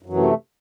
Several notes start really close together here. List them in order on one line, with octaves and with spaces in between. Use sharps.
F#2 F#3 E3 C3 A3